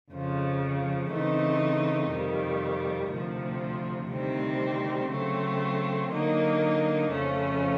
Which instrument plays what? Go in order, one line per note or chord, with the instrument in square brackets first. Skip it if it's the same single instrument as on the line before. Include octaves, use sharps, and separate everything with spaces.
[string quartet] F2 C#3 F3
C#3 E3 A3 C4 D#4
F2 C3 D#3 G3
D2 C3 F3
D2 C3 D#3 G3 C4
C#3 F#3 A3 C4
D3 F#3 A#3 D#4
F2 C#3 F3 A3 C#4